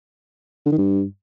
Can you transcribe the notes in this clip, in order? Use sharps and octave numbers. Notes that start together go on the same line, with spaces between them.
D3
D#3
G2